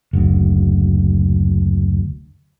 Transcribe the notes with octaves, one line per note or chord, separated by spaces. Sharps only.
F#1 D2